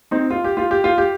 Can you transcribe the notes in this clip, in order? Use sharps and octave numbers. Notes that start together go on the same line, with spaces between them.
C4 D#4
F4
G4
F4
G4
F4
G4